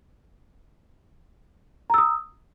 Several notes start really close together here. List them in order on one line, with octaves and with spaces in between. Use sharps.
A#5 E6 D#6